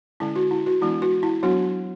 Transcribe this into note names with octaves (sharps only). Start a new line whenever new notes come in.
D3 G#3 C#4 E4
F#4
E4
F#4
E3 G#3 B3 D4 E4
F#4
E4
F#3 B3 D4 F#4